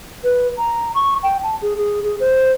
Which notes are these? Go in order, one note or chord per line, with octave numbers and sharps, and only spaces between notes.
B4
A#5
C#6
G5
A5
G#4
G#4
G#4
C5